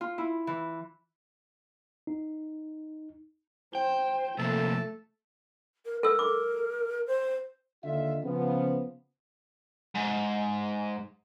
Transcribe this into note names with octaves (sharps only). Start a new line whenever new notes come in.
F4
E4
E3
D#4
C5 G5
C3 F3 A3 A#3 A4
A#4
A4 A#4 E6
D6
C5
D#2 D3 F4 D#5 E5
C#3 F3 B3
G#2